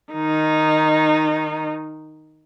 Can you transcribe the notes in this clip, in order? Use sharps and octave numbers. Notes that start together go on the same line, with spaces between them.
D#3 D#4